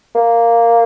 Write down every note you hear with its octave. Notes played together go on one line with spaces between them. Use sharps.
A#3